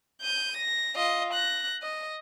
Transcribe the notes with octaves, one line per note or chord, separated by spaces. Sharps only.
G6 D#7
A#6
F4 D#5
F#6 A#6
D#5